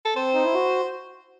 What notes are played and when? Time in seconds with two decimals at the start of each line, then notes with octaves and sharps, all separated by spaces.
0.05 A4
0.16 C4 C5
0.34 D#4
0.45 E4
0.54 F#4